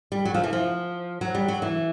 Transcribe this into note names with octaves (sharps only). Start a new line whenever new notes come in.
G3
F#3
F3
E3
F3
F#3
G3
F#3
E3